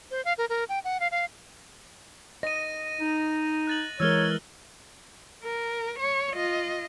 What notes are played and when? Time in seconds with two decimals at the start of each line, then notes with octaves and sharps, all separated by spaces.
0.11 C5
0.25 F5
0.38 A#4
0.49 A#4
0.69 G5
0.84 F#5
1.00 F5
1.11 F5
2.43 D#5 A#6 D#7
3.01 D#4
3.67 F#6 A6 F#7
4.00 E3 G#3 A#4 C#5 E6 F6 G7
5.43 A#4
5.99 C#5
6.33 F4 D#5